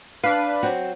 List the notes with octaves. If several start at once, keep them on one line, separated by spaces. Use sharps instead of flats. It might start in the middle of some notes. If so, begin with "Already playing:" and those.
D4 B4 F5
F#3 C4 F#4